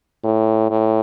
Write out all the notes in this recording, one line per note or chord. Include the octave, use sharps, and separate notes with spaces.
A2
A2